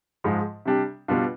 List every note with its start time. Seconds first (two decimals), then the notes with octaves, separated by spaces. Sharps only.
0.24 G#2 F3 G#3
0.65 C3 G3 D4 G4
1.08 B2 G3 D4 F4